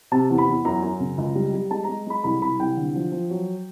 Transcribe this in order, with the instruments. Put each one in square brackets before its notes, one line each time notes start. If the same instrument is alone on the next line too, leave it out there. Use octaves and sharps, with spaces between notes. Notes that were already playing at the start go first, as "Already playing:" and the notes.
[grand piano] C3 A5
E2
B5
E2
F#2 A#5
F#2
C#3
C#2
G3
G3
G#3 A5
G#3 A#5
G#3 B5
C2 B5
C2 B5
C2 G5
D3
F3
F3
F#3